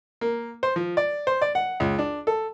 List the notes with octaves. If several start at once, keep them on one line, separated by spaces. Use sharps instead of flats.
A#3
C5
F3
D5
C5
D5
F#5
C#2
D4
A4